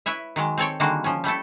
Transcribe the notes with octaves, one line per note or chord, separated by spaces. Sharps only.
E4 B4 C#5 E5
D#3 F#3 G#3
C4 A4 C#5 G5
D3 D#3 G3 G#3 A#3 F#4
F3 C#4
G3 A3 E4 A4